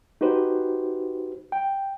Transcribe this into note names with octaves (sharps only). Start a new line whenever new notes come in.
D#4 F#4 G4 B4 C5
G5